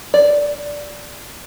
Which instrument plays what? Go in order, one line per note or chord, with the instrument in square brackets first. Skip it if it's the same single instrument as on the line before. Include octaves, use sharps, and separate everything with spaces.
[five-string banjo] D5